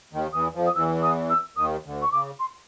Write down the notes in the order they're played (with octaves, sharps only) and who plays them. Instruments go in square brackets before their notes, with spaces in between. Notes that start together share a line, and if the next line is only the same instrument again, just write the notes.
[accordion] D#2 D#3
[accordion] E2 E3 [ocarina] D#6
[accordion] F2 F3
[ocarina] D#6
[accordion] E2 E3 [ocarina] E6
[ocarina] D#6
E6
[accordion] D#2 D#3 [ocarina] D#6
[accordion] D2 D3
[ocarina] C#6
[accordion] C#3 [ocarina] D6
[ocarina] C6